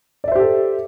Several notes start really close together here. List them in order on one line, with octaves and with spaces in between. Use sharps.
D5 E5 C5 G4 A4